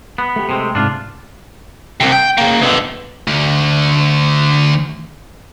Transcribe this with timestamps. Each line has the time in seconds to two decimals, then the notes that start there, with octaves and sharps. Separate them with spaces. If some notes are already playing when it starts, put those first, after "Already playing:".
0.18 B3
0.36 A3 G4
0.49 C3 G#3 C4
0.75 G#2 C3 D4 F4
2.00 C2 C3
2.12 G5
2.38 C#3 A#3
2.61 B2 D3
3.28 D2 D3